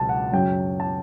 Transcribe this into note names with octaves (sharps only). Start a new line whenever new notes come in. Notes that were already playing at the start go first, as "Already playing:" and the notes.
Already playing: C#2 B2 F#3 A5
F#5
F#2 C#3 F#3 G5
A5